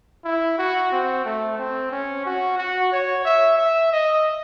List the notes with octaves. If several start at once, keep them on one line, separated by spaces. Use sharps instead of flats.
E4
F#4
C4
A3
C4
C#4
F#4
F#4
C#5
E5
E5
D#5